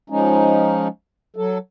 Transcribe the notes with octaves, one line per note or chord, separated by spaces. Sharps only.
F3 G#3 C#4 D#4
F#3 A4